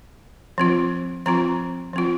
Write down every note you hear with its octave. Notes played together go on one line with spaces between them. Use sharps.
F3 C4 F4
F3 C4 F4 A#5
F3 C4 F4